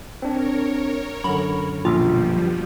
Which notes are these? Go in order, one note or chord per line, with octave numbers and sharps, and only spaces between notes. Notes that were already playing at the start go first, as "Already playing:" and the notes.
C4 D4 A#4 C#5
F#2 D3 B5
A#1 B2 F3 G3 F4